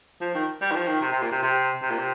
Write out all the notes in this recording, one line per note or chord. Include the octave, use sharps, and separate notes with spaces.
F3
D#3
G3
D#3
F3
D#3
C3
C3
A#2
C3
C3
C3
A#2
C3